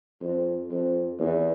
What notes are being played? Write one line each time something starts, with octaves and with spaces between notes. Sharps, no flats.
F2
F2
E2